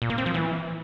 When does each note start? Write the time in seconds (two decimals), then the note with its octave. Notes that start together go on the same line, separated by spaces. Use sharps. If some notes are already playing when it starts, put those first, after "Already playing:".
0.02 A#2
0.10 A#3
0.18 C4
0.26 F3
0.34 E3